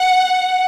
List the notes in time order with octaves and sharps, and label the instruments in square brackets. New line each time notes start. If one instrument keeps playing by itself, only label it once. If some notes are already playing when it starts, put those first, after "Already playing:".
Already playing: [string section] F#5